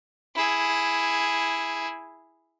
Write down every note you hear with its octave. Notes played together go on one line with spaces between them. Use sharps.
E4 G#4